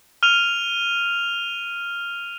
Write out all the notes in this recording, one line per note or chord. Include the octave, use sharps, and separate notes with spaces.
F6 D#7 F7